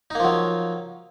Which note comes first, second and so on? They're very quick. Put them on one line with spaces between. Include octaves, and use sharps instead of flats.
D#4 A#3 F3 F#3